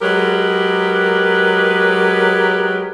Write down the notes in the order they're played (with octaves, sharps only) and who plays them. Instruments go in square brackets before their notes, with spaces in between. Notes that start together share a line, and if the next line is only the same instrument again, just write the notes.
[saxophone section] F#3 G#3 G4 A#4 B4